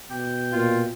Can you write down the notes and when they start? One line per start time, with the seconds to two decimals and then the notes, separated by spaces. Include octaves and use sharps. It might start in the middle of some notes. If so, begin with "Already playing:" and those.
0.11 B2 G5
0.53 A#2 F4